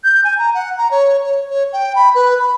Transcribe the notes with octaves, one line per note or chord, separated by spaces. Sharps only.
G6
G#5
A#5
F#5
A#5
C#5
C#5
C#5
G5
B5
B4
B5